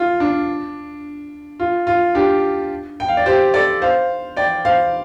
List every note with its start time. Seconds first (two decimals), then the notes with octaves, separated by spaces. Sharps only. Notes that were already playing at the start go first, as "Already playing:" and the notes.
Already playing: F4
0.20 D4
1.60 F4
1.87 F4
2.15 D4 G4
3.00 G5
3.08 F5
3.17 D5
3.26 G4 C5
3.54 A4 D5
3.82 C5 F5
4.37 D5 G5
4.65 C5 F5